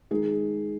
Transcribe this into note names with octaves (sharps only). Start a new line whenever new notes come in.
D#3 G#3 D#4 G#4